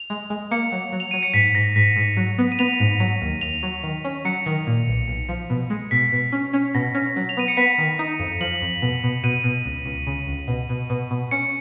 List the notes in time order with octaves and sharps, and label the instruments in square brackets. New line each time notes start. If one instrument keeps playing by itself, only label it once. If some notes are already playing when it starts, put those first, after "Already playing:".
Already playing: [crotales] F7
[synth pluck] G#3
G#3
[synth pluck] A#3 [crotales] C#7
[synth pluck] F#3
F#3
[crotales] F7
[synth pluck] F#3 [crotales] D#7
[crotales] C#7
[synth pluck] G#2 [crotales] B6
[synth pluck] G#2 [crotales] A#6
[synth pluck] G#2 [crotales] B6
[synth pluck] G#2
F#3
B3
[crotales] D#7
[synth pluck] B3 [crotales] F7
[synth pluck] G#2
F#3
D#2
[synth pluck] D#2 [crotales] F7
[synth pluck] F#3
D#3
C#4
[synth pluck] F#3 [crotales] C#7
[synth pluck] D#3
A#2
B1
B1
F3
B2
G#3
[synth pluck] B2 [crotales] B6
[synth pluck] B2
C#4
C#4
[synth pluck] B2 [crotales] A#6
[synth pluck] C#4
F#3
[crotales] F7
[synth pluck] B3 [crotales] D#7
[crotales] C#7
[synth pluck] B3 [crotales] B6
[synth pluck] D#3
D#4
F2
[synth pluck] F3 [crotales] F#7
[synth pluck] F2
B2
B2
[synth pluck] B2 [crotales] D#7
[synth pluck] B2
C#2
C#2
C#3
C#2
B2
B2
B2
B2
[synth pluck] C#4 [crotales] C#7